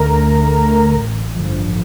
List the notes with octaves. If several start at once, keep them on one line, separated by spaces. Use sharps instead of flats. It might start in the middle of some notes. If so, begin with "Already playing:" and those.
Already playing: D2 D3 A3 A#4 A#5
D2
D3 A3
A1
G2 D3 F3